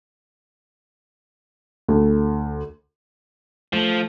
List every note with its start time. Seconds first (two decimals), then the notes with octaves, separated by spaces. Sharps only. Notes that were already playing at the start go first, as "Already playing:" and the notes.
1.88 D2
3.73 F3 A3